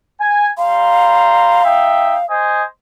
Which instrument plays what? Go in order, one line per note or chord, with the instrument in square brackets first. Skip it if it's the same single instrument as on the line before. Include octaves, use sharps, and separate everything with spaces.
[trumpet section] G#5
[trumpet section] G3 A#5 C6 [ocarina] F5
[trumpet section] D#4 E5 G5
C5 D#5 G#5